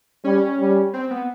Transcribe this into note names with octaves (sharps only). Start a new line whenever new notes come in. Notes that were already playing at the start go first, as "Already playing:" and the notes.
G3 C#4
G3
C4
B3